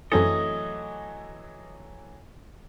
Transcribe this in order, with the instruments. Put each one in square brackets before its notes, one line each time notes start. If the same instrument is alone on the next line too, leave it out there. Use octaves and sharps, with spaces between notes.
[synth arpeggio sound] F#2 C4 A4 [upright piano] E3 F#3 A3 [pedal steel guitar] D#5